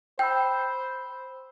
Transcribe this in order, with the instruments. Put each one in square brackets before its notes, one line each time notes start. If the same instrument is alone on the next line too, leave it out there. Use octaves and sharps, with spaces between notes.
[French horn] C5 [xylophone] G5 [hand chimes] B5 E6 G6